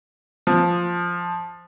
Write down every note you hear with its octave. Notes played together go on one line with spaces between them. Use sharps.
F3